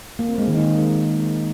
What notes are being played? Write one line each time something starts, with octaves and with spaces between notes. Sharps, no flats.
A#3
C4
G#3
D#3
D#4